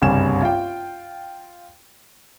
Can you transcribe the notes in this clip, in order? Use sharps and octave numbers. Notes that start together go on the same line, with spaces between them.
F#1 C2 G2 G#5 E7
F4 G5